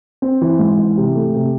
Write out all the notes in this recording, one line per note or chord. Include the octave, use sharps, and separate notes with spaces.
C4
E3
G#2
E3
C3
A3
C3